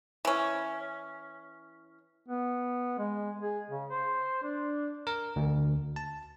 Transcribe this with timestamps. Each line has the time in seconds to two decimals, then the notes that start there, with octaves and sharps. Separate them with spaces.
0.25 E3 C#4
2.28 B3
2.98 G#3
3.41 G#4
3.70 C#3
3.90 C5
4.43 D4
5.07 A#4
5.36 D2
5.96 A5